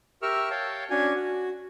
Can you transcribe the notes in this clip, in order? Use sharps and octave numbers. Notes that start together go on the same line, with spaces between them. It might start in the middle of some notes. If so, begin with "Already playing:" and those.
G4 A#4 E5 C#6 E6 F6
C#5 F5 G5 A5
C#4 D4 F#4 C#5 G#5
F#4